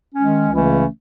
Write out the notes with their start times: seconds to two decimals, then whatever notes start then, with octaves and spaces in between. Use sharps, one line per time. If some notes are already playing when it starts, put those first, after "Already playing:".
0.15 D#3 G#3 C#4
0.50 C#2 C#3 E3 A3 C#4